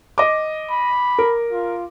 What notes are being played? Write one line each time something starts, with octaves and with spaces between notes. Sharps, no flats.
D#5 D6
B5
A#4
F4